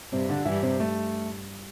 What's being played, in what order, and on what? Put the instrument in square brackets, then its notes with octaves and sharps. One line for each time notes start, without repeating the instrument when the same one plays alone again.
[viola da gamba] G2 [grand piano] C3 C4
[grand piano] D3 D4
[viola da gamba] G2 [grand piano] E3 E4
[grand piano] C3 C4
A3